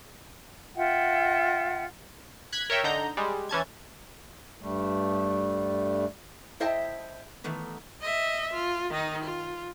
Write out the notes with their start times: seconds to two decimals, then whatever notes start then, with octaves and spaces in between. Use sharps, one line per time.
0.76 F4 E5 F#5 G5
2.52 F#6 G#6 B6
2.70 A#4 C#5 E5 G5
2.84 D3 D#4 A#5 G6
3.17 G3 G#3
3.49 E3 C#4 A5 G#6
4.61 G2 G3 A3
6.60 E4 C5 D#5 E5 G5 A5
7.44 D#3 E3 A3 B3
8.01 D#5 E5
8.53 F4
8.90 D#3 D#4
9.24 F4